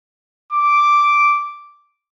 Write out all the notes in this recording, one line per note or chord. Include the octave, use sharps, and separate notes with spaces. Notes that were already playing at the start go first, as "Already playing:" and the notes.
D6